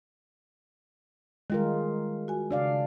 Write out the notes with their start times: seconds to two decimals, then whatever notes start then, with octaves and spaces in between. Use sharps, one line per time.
1.50 D#3 G3 G#3 F4 A#4
2.28 F#4 G#5
2.51 C#3 D4 D5 F5